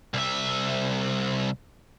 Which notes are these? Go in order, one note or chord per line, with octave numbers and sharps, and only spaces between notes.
C2 E5